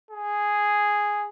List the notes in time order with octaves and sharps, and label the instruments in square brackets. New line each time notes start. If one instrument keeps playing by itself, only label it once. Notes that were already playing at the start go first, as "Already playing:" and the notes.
[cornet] G#4